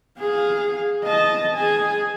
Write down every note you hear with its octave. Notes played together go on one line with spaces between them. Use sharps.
G#4 F5
D#5 A5
G#4 G#5